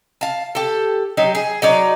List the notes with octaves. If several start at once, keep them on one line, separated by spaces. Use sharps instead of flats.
F5 A5
G4 A4
F#3 D#4 G4
G#4
F#3 D#4 D5